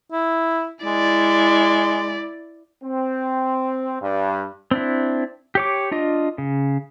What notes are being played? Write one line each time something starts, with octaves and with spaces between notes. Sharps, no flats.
E4
G#3 E4 D5
C4
G2
C4 D4 E4
G4 C#5 D6
D4 F4 D#5
C#3